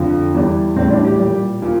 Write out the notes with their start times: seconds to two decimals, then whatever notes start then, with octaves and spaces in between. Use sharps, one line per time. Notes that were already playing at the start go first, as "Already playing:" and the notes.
Already playing: F2 D3 F3
0.33 E2 E3 G3
0.76 A2 E3 G3 C4
0.91 D4
1.05 G4
1.19 A#2 G3
1.62 A#2 F3